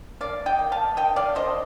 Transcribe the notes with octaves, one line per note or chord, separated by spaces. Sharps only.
A#3 D5 F5
D#5 G5
A#3
F5 A5
D#3 D#5 G5
D5 F5
A#3 C5 D#5